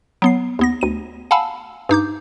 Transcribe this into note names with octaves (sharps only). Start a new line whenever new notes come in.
F#3 B3 C7
D#2 B3 A#6
D2 D#7
F5 F#5 G#5 A5 B5 E6
G2 D#4 D6 G6